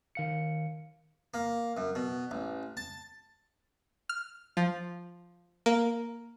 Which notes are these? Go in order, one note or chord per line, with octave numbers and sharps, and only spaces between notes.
D#3 F5 C#7
A#3
F#2
B2
A1
A5
F6
F3
A#3